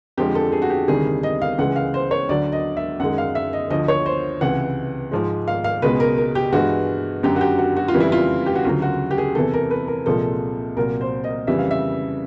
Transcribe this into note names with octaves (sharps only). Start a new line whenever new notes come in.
F2 D3 F3 G#3 G4
A4
G#4
F#4
G4
D2 C3 D#3 G3 G#4
D#5
F5
C#2 C#3 E3 G#3 F#5
F5
C5
C#5
D2 D3 F#3 D5
D#5
E5
F#2 D#3 G#3 F#5
F5
E5
D#5
D2 D3 F3 D#5
C#5
C5
C#2 C3 E3 F#5
G#2 F3 G#3
F5
F5
C#2 B2 G#3 B4
A#4
A#4
G4
G2 E3 G#3 F#4
F#2 D3 F#3 G4
F#4
G4
F#4
F#4
F4
F2 C#3 E3 G3
E4
F4
G4
F#4
D2 C#3 F#3 F4
F#4
G4
G#4
E2 C3 E3 A4
A#4
B4
A#4
C2 A#2 F3 G#3 A4
C2 A#2 F#3 A#4
C5
D#5
F2 C#3 E3 G3 E5
F5
E5